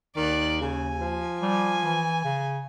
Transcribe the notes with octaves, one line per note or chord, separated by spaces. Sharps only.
D#2 D#3 D5 F#6
C#3 G#5
F3
G3 G#5
E3
C#3